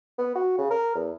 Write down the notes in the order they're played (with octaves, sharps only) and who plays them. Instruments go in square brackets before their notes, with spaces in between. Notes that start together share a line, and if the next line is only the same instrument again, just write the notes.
[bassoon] B3
F#4
C#3
A#4
E2